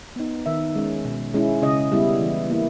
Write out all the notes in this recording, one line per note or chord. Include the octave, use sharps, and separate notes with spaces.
B3 D#4
D#3 E5
G#3 C#4
B2
G#3 C#4 E4
C#3 D#5
G3 B3 E4
E3
A#3 E4